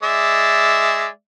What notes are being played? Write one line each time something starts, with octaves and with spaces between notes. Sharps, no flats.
G#3 D5 E5